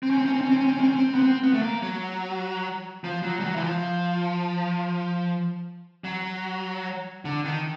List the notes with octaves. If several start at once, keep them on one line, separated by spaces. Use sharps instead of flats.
C4
C#4
C4
C#4
C4
C#4
C4
C#4
C4
C#4
C4
C#4
C4
B3
C4
B3
A3
A#3
F#3
F3
F#3
G3
F#3
E3
F3
F#3
D3
D#3